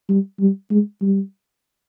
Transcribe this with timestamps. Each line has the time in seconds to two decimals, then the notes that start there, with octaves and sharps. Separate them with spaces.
0.09 G3
0.40 G3
0.71 G#3
1.02 G3